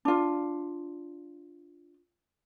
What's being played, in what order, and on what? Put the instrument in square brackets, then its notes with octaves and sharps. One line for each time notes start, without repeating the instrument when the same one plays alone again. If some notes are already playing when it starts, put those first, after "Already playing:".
[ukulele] D4 F4